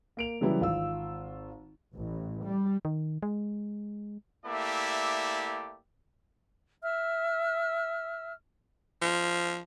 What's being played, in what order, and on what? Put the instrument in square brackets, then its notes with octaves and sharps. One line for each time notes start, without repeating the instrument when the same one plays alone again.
[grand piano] A#3 D7 F7
C#3 E3 F#3 G3 E4 B4
G#1 F4 E6
[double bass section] A1
G3
[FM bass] D#3
G#3
[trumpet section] A3 A#3 E4 G4 D5 E5
[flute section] E5 E6 F6
[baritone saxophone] F3